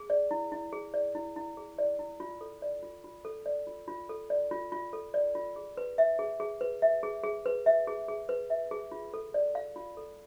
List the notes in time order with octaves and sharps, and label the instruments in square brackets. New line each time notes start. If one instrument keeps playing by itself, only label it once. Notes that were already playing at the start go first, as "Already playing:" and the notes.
Already playing: [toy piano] G#4
D5
E4
E4
G#4
D5
E4
E4
G#4
D5
E4
F4
A4
D5
F4
F4
A4
D5
F4
F4
A4
D5
F4
F4
A4
D5
F4
G#4
B4
E5
G#4
G#4
B4
E5
G#4
G#4
B4
E5
G#4
G#4
B4
E5
G#4
F4
A4
D5
F5
F4
A4